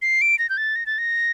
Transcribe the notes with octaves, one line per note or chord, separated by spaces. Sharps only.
C7
D7
A#6
G6
A6
A#6
A6
A#6